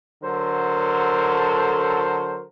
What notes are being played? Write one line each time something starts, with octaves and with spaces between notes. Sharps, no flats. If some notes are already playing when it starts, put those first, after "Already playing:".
D3 F#3 A4 A#4 C5